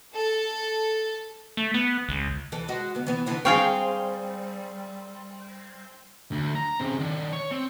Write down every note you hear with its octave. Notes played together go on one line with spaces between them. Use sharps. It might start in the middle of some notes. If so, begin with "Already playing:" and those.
A4
A3
B3
C#2
E3 A4
G#3 F#4
D2 B3
E3 B3
D3 E3 B3
G3 C4 G#4 F5 G5 C#6
D2
A#5
C#3 C4
D#3 D4
C#5
C4